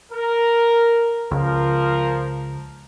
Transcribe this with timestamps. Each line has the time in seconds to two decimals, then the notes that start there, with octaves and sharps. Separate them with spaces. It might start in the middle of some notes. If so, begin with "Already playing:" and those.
0.12 A#4
1.31 C#2 F3 A#4